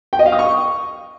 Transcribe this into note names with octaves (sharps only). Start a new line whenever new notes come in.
G5
D#5
F5
D#6
C#6